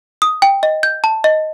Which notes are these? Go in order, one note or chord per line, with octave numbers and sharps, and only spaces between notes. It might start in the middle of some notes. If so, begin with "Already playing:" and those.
D#6
G5
D#5
G6
A5
D#5